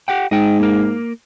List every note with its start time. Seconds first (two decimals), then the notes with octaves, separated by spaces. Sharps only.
0.08 G4 F#5 G5
0.31 G#2 D#5 G5
0.60 A#3 A#4